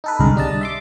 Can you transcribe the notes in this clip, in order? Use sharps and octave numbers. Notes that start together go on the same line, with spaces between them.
D#4 A4 B4
C2 G#2 D3 G#3 A#4
G3 D4 D#5 A5
E5 C6 D6